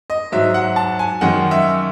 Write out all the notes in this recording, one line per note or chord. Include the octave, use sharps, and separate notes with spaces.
D#5
G#2 F#3 E5
F#5
A5
G#5
F#2 D#3 G#3 F#5
E5